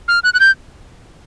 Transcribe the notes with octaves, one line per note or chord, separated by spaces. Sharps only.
F6
F#6
F#6
G6